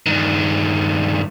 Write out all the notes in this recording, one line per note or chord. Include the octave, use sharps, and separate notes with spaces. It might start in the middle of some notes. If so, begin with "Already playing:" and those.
G2 D#3